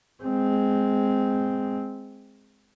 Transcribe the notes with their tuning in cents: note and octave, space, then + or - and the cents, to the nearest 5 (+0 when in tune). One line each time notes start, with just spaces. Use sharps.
G#3 +0 C4 -10